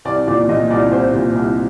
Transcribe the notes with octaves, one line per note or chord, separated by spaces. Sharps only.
C2 D5
A#2 D5
A#2 D#5
C2 D5
C2 C5
A#2
C2